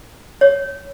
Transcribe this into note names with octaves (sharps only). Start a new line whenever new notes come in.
C#5